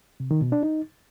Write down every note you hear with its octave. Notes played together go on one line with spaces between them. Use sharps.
C3
D#3
B2
D4
D#4